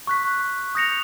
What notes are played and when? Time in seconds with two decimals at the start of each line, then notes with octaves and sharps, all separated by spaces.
0.07 C#6 F#6 B6
0.75 D#6 G6 A#6 C#7 F7